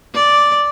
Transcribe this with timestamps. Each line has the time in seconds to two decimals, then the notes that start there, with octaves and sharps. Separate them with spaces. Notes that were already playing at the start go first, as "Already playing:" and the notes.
0.14 D5